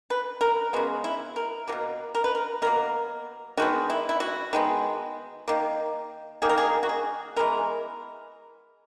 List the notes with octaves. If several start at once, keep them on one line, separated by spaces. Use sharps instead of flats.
B4
A#4
C#3 G#3 B3 F#4
E4
A#4
B2 F#3 A#3 A#4
A#4
B4
A#4
B2 F#3 A#3 A#4
D#3 G#3 B3 F#4
E4
E4
F#4
D#3 G#3 B3
D#3 A#3
D#3 A#3 G#4
A#4
G#4
F#4
G#4
E3 G#3 B3 A#4